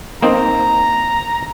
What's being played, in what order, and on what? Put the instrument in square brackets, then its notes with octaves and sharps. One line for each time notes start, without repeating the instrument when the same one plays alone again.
[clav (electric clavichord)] A#3 C4 D#4 [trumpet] A#5